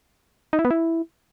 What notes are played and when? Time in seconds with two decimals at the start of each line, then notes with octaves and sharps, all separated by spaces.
0.53 D#4
0.59 E4
0.65 B3
0.71 E4